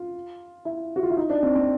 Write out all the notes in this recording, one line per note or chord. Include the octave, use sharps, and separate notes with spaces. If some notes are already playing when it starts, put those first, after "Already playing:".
Already playing: F4
E4
F#4
F4
E4
D#4
D4
C4
C4